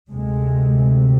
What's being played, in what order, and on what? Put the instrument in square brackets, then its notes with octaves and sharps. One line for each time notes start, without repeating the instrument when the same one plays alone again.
[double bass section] D2 C3 G#3